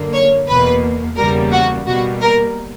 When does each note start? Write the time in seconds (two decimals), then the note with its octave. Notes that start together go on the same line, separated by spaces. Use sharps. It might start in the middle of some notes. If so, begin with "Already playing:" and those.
Already playing: F#2 D3 A#3
0.13 C#5
0.48 E2 B2 A#3 B4
1.17 E2 C#3 G3 A#3 A#4
1.52 F#4
1.86 B2 G3 A#3 F#4
2.21 A#4